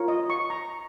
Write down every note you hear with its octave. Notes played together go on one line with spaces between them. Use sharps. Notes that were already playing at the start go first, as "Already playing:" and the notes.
Already playing: F4 A#4 C#5
D#5
C#6
A#5